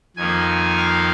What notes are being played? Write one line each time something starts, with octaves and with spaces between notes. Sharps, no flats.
F2 D#3 A#3 G#5
F5